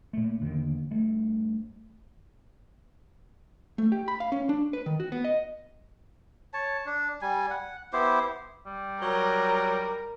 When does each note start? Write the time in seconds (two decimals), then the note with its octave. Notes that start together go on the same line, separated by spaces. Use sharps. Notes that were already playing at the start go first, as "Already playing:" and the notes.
0.13 A#2 A3
0.41 E2 D3 D#3 A#3
0.91 G2 A3
3.78 A3
3.92 G4
4.08 B5
4.20 F5
4.32 C#4
4.49 D4
4.73 B4
4.86 D#3
5.00 F#4
5.12 B3
5.24 D#5
6.54 C#5 A5
6.86 D4
7.22 G3 G#5
7.50 F#5
7.93 B3 E4 G4 C5
8.66 G3
9.02 F#3 A#4